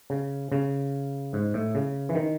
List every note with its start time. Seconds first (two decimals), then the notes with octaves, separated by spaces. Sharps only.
0.10 C#3
0.52 C#3
1.33 G#2
1.54 A2
1.75 C#3
2.09 E3
2.15 D#3